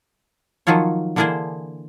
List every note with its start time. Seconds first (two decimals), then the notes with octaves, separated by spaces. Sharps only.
0.67 D#3 F3 F#3 F4 C#5
1.16 D3 E3 A#3 D4 G#4 C5